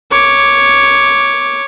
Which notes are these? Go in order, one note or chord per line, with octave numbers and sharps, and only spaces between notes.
C#5 D6